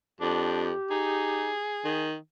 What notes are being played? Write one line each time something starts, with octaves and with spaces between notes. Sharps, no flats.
F2 D4 G4
D#4 G#4
D#3